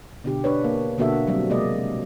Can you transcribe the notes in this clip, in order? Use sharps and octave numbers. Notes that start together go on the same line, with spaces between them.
B2 D3 G4
D4 B4 C#5
A#3
B2 D3 A#3 F#4 A4 E5
F#3 G3 C4
C3 G#3 A#3 D5 D#5